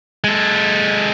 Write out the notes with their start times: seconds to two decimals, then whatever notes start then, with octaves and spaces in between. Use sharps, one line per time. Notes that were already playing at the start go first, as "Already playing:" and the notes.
0.24 G#3 A4